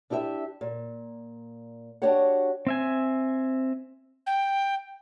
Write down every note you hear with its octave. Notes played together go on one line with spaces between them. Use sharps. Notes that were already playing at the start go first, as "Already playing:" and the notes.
D4 E4 G4 D#5 E5
A#2
D4 F#4 G4 C#5 F#5
C4 E5 G#5
G5